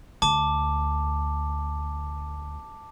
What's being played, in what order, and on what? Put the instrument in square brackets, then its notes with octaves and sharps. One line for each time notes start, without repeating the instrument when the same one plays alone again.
[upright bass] D2 [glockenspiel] A5 D6